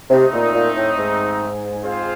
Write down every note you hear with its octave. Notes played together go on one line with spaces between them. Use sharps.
C3 A3 C4 D#4
A#2
A#2
A2
G#2
C4 F4 G#4 C5 F5